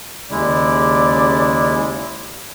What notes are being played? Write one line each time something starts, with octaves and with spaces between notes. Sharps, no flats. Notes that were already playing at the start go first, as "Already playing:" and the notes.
D#2 C#3 G#3 E4 D5